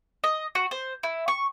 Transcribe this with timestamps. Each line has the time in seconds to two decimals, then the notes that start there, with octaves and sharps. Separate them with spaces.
0.24 D#5
0.55 F#4
0.71 C5
1.03 E4
1.28 C#6